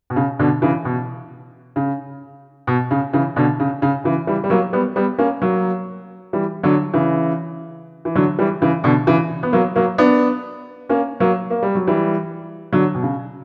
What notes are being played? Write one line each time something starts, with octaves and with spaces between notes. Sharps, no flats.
B2
C#3
B2 D3
C#3 E3
B2
C#3
B2
C#3
C#3 E3
B2 D3
C#3
C#3
C#3 E3
E3 G3
G3
F#3 A#3
G3 B3
G3 B3
A#3 C#4
F#3 A#3
E3 G3
D3 F#3
C#3 E3
E3
D3 F#3
E3 G3
C#3 E3
B2 D3
C#3 E3
B3
F#3 A#3
F#3 A#3
B3 D4
A#3 C#4
F#3 A#3
A#3
G3
F#3
E3 G3
D3 F#3
B2
C#3